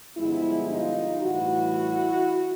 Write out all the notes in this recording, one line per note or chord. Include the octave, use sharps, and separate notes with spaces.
G2 D3 F3 G#3 B3 E4
D#4 F4
A2 E3 G3 E4 F#4